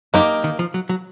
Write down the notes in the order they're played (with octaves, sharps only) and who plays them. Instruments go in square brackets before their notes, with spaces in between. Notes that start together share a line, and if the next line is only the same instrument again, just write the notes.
[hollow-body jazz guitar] F#2 [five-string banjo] A#3 D#4 G4
[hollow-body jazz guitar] D#3
F3
F#3
F#3